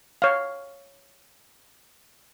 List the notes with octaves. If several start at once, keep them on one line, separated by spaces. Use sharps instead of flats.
C#5 F5